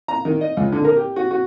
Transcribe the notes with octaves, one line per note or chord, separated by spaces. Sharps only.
A#5
D#3
D#5
C#2
D3
A#4
G4
F#4
F#4